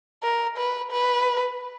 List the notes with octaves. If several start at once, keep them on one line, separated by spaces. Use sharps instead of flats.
A#4
B4
B4